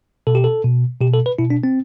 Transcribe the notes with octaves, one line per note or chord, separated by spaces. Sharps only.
B2 A4
G4
A4
B2
B2 G4
A4
B4
B2 E4
D4
C4